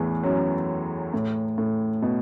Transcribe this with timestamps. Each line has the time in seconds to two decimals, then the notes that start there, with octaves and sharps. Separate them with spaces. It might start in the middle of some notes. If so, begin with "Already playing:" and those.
Already playing: E2 A2 E3
0.23 F#2 F#3
1.14 A2
1.58 A2
2.02 B2